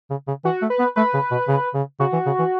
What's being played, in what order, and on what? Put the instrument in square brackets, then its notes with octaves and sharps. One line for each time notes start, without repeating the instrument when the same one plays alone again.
[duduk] C#3
C#3
[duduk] E3 [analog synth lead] F#4
[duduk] A3
[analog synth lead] B4
[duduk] B3
[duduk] A3 [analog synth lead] B4
[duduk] C#3
B2
C#3
C#3
[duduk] C#3 [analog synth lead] F#4
[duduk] E3
C#3
E3